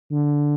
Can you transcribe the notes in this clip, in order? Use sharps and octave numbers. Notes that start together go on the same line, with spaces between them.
D3